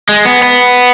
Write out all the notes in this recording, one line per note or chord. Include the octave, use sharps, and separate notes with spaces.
G#3
B3
B3